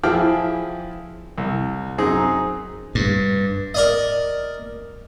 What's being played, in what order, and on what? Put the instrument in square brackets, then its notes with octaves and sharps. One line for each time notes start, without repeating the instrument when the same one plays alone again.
[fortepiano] E3 F3 E4 G#4 G5 F6
C2
F#2 C4 D#4 G#4
[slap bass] G2
[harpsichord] A#4 D5 D#5